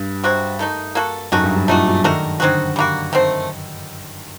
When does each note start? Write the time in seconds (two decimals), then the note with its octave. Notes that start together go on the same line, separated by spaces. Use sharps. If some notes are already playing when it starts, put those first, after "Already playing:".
Already playing: G2
0.24 C3 F#3 C4 F#4
0.59 D#3 A3 D#4
0.95 A#3 F#4 A4
1.32 F#2 D#3 A3 D#4 F#4
1.44 G2
1.56 G2
1.68 A#2 A3 D#4 F#4
1.86 F#3
2.04 D#3 A3 D4 F#4 A#4
2.40 D3 F#3 C4 D#4 F#4
2.76 G3 A#3 F#4
3.13 D#3 F#3 A3 C4